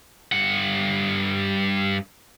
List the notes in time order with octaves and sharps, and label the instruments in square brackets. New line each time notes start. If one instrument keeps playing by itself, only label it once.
[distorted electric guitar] G2 F#5